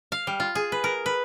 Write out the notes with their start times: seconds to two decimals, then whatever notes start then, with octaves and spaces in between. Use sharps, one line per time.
0.12 F5
0.27 G3
0.40 F4
0.55 G#4
0.72 B4
0.84 A#4
1.06 B4